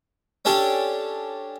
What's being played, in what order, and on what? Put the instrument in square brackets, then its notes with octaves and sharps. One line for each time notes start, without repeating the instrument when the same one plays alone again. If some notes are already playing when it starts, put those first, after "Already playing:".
[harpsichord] C#4 D4 G4 A4 G5